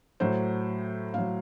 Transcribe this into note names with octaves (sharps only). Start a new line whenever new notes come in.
A2 F#3 C5
A2 F#3 F5